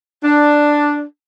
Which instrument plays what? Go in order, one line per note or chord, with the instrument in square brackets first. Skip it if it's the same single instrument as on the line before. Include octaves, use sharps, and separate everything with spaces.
[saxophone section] D4